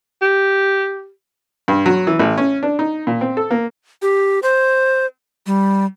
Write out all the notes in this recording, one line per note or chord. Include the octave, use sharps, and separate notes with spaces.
G4
G2
F#3
E3
A1
C#4
D4
D#4
A#2
C4
A4
A#3
G4
C5
G3